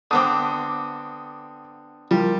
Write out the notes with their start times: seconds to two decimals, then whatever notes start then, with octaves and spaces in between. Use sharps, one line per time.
0.11 D3 B3 C4 D6 D#6
2.11 F3 G3 F4 A#4